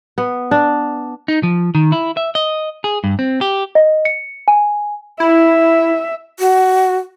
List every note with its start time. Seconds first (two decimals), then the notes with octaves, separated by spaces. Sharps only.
0.18 B3
0.51 D4
1.28 D#4
1.43 F3
1.75 D#3
1.92 E4
2.17 E5
2.35 D#5
2.84 G#4
3.04 G2
3.19 C4
3.41 G4
3.75 D#5
4.05 C#7
4.48 G#5
5.20 E4 E5
6.39 F#4